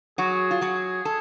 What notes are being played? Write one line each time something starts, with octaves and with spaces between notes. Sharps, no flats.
F#3 F#4 G#4
F4
F#3 F#4
A4